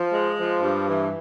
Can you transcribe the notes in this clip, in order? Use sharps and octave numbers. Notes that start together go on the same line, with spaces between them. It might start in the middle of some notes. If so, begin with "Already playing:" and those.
Already playing: F3
G#3
F3
G2
E3